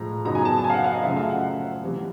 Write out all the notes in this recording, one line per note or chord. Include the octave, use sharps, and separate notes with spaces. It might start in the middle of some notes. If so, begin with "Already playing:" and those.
Already playing: A2 F3 G#3 A#5
F#2 C#3 F#3 B3 D#4 A#5
G#5
A5
A5
G#5
F5
F#5
F5
D#5
F#2 C#3 F3 A3 E5
F5
F#5
C3 E3 G3